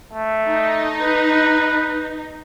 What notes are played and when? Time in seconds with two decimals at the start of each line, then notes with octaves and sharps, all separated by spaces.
0.13 A3
0.48 D#4
1.02 B4